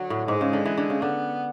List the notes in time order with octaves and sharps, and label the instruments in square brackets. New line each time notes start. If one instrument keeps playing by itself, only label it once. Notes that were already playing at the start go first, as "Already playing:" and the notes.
Already playing: [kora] D3 [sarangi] F#3
[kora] A2
[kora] G#2 [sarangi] G#3
[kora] C#3
D3
E3
D3
C#3
[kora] D3 [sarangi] B3